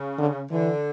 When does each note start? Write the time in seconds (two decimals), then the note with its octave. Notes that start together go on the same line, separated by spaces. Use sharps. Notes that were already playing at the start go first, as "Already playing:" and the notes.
Already playing: C#3
0.18 D3
0.51 D3 E3